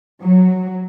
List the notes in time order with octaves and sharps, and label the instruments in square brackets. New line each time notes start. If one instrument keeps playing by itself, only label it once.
[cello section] F#3